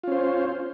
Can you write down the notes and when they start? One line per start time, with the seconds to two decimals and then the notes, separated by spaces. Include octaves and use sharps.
0.04 F4
0.08 C#4
0.12 C5